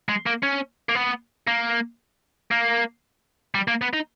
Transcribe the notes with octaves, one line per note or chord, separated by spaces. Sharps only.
G#3
A#3
C#4
A#3
B3
A#3
A#3
G3
A#3
B3
D#4